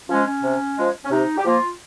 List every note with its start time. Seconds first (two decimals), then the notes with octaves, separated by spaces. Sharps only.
0.09 F3 G#3 C#4
0.26 C#4
0.43 C3
0.77 F3 G#3
1.04 C#4
1.11 C3 D#4
1.37 G4
1.45 F3 A#3 F4